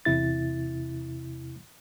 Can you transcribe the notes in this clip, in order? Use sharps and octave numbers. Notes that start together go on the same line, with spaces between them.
E2 C3 E4 A6